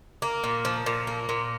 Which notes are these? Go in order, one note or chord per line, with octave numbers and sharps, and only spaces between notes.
A#3
A#2
F3
A#2
A#3
A#2